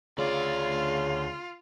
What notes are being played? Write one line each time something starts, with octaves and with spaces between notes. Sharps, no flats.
D2 C#3 F4 D5